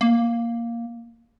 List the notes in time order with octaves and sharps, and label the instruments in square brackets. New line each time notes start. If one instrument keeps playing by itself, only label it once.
[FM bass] A#3